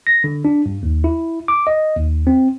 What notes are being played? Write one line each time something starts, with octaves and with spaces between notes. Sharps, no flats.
A#6
D3
D4
G2
D#2
E4
D6
D#5
D#2
C4